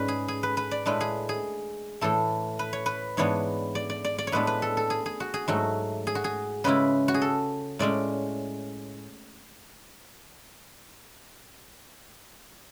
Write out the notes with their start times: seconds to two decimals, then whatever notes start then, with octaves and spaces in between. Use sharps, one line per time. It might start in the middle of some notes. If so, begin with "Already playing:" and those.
Already playing: G#2 C#4 B4 D5
0.08 G#4
0.28 G#4
0.43 B4
0.57 B4
0.71 D5
0.85 A2 G#3 D4 B4
1.01 G#4
1.29 G#4
2.01 A2 E3 A3 A4
2.59 B4
2.73 C#5
2.86 B4
3.17 G#2 E3 B3 D4 C#5
3.75 D5
3.90 D5
4.04 D5
4.18 D5
4.27 C#5
4.32 A2 G#3 B3 D4 B4
4.47 B4
4.62 A4
4.77 A4
4.90 G#4
5.06 G#4
5.20 F#4
5.34 G#4
5.48 G#2 F#3 A3 F#4
6.07 G#4
6.15 F#4
6.24 G#4
6.64 C#3 G#3 C#4 E4 B4
7.08 F#4
7.14 G#4
7.22 A4
7.79 A2 G#3 C#4 D5